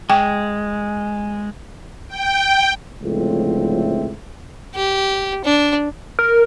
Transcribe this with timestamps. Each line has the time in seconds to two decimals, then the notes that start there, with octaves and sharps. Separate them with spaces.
0.10 G#3 G5
2.08 G5
3.02 C#2 A2 D3 F3 A3 C4
4.75 G4
5.44 D4
6.19 A#4